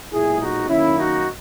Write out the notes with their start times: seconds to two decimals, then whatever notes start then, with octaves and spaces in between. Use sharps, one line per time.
0.13 B1 A#2 G#3 E4 G#4
0.41 D#4 F#4
0.69 F#2 D#3 A#3 C#4 E4
0.98 D#4 F#4